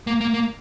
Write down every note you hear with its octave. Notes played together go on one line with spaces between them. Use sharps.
A#3
A#3
A#3